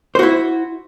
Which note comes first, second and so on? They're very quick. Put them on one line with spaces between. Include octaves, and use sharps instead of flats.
C5 F#4 E4